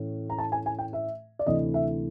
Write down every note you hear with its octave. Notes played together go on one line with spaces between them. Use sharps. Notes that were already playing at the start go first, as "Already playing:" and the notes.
Already playing: A2 E3 A3 C#4
A#5
A5
G#5
G#5
G5
E5
D5
D2 C3 E3 A3 D#5
E5